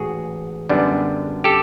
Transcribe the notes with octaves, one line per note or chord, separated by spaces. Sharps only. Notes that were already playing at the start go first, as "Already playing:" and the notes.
Already playing: A1 G#2 F#4 G#4
F#2 D3 G3 B3 D4
G4 A4